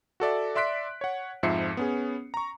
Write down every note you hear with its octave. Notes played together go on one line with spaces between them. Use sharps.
F#4 A4 D5 E5
D5 E5 C6 F#6 B6 D7
C#5 F#5
F2 G#2 F3 E5 C7 C#7
B3 C#4 G#4
A#5 C#6